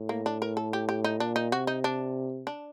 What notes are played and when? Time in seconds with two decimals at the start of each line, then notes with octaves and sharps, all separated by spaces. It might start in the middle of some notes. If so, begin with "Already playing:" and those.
Already playing: A2
0.09 A#3
0.26 D4
0.42 A#4
0.57 A4
0.73 G4
0.89 G4
1.04 D#4
1.20 A#2 D4
1.36 D#4
1.52 C3 F#4
1.67 D#4
1.84 D4
2.47 D4